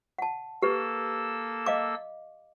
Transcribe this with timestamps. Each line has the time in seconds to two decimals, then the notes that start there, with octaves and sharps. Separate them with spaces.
0.18 F#5 A5
0.62 A#3 G4 A4 B4 E6
1.66 D#5 F5 D6